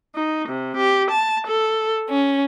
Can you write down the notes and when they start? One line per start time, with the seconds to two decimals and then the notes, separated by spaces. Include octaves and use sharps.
0.14 D#4
0.48 C3
0.77 G4
1.10 A5
1.47 A4
2.09 C#4